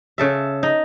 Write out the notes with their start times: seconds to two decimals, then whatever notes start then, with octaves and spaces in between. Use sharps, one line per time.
0.18 C#3 A4 E5
0.63 D#4